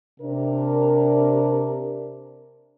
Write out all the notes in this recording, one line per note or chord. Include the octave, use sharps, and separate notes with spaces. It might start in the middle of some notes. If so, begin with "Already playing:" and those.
C3 D4 A#4